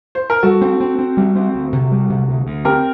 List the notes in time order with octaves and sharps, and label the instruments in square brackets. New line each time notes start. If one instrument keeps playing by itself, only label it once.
[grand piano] C5
A#4
[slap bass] G3 [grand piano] F#4 A4
[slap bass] C4
C4
C4
G3
C4
D2
C3
G3
C3
D2
D2
[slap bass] C4 [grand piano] G4 A#4